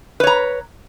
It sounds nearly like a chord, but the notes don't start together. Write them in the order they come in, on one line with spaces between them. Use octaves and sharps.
B4 C#5 A#5